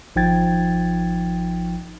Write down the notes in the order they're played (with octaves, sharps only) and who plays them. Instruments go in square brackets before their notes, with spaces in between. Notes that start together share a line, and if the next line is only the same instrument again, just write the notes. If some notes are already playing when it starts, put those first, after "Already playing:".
[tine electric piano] G#1 F3 D#4 G5 G#6 A6